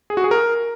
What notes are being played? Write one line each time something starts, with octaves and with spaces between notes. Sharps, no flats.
G#4
F#4
G#4
A#4